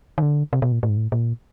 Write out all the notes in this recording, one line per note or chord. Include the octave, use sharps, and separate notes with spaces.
D#3
D3
C3
B2
A#2
A2
G#2
A2
A#2